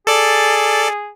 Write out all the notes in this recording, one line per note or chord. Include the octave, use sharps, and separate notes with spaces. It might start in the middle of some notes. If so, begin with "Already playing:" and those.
G#4 A4 D5